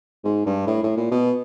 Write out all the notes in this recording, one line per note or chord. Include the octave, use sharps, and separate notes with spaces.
G#2
G2
A2
A2
A#2
B2